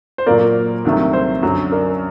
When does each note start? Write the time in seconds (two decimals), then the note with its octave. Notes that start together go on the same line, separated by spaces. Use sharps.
0.18 C5
0.26 A#2 F#3 A#3 A#4 D5
0.85 C2 C3 D#3 F#3 A3
1.13 C5
1.43 F#2 D3 F#3
1.72 A#4 D5